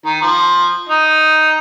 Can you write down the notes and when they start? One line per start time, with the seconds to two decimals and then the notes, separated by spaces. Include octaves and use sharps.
0.06 D#3
0.22 F3
0.89 D#4